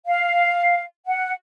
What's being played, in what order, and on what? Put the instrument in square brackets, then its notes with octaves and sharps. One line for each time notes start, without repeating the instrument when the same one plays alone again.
[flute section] F5
F#5